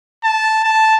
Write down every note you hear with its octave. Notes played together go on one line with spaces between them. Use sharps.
A5
A5